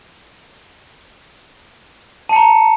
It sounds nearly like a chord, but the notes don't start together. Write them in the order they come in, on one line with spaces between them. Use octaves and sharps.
A5 C#7 A#5